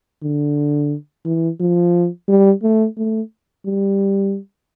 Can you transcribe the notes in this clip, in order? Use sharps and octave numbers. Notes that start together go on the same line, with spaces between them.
D3
E3
F3
G3
A3
A3
G3